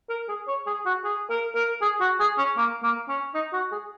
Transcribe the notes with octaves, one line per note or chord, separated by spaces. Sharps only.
A#4
G#4
C#5
G#4
F#4
G#4
A#4
A#4
G#4
F#4
G#4
C#4
A#3
A#3
C#4
D#4
F#4
G#4